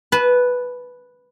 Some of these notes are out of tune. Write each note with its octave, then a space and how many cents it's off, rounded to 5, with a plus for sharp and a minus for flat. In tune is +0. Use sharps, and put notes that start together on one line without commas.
B4 +0 A5 -35